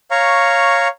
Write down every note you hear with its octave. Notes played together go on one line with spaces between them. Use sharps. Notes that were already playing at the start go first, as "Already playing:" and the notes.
C#5 F5 A#5 C#6